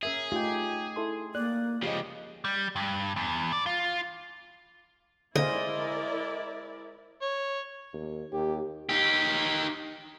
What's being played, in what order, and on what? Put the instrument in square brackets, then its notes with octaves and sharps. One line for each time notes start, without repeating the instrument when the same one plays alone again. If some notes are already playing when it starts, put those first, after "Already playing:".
[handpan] C#4 A#4 E5 [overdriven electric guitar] G#4
[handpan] A3 D#4 G4 [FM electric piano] F4 G5
[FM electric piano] E4 A4 C6
[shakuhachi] A#3 [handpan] D5 [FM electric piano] F#6
[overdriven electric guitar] C#3 F3 [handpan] G4 D#5
[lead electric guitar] G3
G2
E2
D5
F4
[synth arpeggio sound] D3 [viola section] E4 A#4 D5 [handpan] G#4 C5 F5 [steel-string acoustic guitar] D#5
[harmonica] C#5
[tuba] D#2
[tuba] D#2 [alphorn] G4
[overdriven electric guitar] D#4 G4